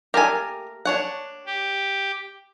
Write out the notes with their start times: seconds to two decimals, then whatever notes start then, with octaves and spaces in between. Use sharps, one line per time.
0.14 A3 A#3 G4 A#4 G#5
0.85 D4 C#5 F#5
1.46 G4